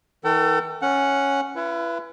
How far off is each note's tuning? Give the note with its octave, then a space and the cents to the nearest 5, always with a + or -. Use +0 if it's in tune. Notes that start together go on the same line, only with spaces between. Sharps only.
E3 -45 A4 +30 G5 -40
C#4 +0 F#5 +0
E4 +40 B4 -10